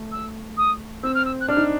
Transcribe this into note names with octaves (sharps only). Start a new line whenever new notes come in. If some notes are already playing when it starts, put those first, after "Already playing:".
Already playing: A3
E6
D#6
C4 E6
F6
E6
F#6
D4 F6
D#4